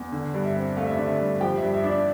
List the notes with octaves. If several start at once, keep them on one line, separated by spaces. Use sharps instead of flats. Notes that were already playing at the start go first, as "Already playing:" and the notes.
Already playing: E2
D3
G2
E5
C4
A3 F5
E5
D3 D5
E5
G2
F3 G4 G5
G2 E5
E5
D4
D5